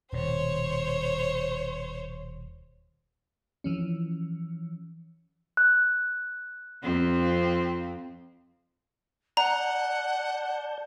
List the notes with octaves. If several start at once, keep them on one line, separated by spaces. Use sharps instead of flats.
D#1 B2 C5 C#5
E3 F3 C#4
F#6
F2 F3 C4
D5 F#5 A5 A#5 G6